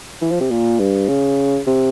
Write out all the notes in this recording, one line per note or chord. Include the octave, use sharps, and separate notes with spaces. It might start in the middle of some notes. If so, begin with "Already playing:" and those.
E3
F3
C3
A#2
G2
C#3
C3